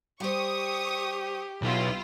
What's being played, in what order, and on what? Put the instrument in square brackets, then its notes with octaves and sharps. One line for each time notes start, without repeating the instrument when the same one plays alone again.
[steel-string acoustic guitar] G3 C5 [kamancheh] G4 [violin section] C#6 D#6
[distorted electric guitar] B1 [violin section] E4 F4